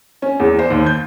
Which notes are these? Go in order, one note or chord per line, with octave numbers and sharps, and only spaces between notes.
C#4
E2
C5
D#2
G6